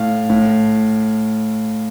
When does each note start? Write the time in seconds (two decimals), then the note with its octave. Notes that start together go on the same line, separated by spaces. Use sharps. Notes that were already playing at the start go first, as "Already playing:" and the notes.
Already playing: A2 F5
0.30 A2